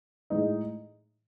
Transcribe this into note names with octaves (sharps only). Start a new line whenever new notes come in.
A2 G#3 D#4